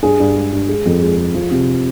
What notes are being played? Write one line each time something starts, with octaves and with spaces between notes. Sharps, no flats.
G2 G#4
G2
G#3
G2
G#3
F2
G#3
G#3
F3
C3